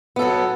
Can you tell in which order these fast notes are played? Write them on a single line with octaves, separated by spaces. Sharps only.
B3 A4 F#3